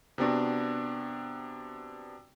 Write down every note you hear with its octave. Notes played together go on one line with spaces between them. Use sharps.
C3 B3 D4 F#4